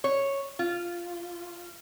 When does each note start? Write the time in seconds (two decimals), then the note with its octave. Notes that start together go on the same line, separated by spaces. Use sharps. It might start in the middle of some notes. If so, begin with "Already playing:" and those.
0.04 C#5
0.59 F4